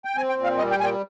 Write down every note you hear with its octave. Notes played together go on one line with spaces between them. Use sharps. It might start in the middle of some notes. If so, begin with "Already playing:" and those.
G5
C4 G#5
G5
A#2
F5
G3 D#5
G5
A#2 G#5
G5